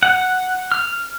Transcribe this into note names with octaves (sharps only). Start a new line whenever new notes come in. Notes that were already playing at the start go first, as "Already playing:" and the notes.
F#5
F6